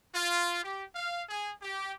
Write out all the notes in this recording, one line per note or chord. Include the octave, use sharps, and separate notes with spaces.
F4
G4
F5
G#4
G4